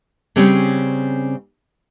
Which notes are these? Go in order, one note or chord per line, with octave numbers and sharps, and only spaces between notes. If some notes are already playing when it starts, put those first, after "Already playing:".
C#3 G3 C4 C#4 G#4 C#5